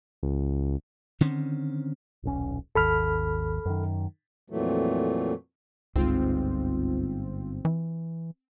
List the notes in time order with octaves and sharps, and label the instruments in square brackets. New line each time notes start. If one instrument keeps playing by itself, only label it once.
[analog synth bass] C#2
[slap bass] D3 D#3 C4 C#4
[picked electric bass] D#1 B1 C#4
[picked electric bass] G#1 D#2 [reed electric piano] A4 B5 F6
[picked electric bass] F#2 D#3
[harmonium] F2 A#2 E3 F#3 A3
[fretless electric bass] G1 G#2 [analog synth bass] C#2 [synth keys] C4 F4
[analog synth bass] E3